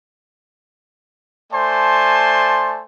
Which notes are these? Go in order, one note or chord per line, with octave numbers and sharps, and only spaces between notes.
A3 C5 D5 G#5 A5 C6